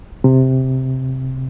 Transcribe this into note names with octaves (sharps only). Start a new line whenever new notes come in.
C3